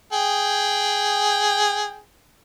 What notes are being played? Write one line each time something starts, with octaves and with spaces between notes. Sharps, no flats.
G#4 G5